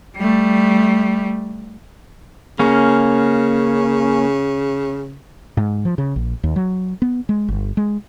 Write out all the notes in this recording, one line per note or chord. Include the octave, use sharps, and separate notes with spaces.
G3 A3
C#3 A#3 C#4
G#2
F3
C#3
A#1
D#2
F#3
B3
G#3
G1
G#3